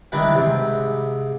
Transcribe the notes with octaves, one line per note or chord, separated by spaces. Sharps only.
D#3 E3 G3 D4 B4
G#2 C3